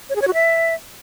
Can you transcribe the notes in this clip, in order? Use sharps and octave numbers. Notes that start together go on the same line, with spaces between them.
C#5
G#4
C#5
F#4
E5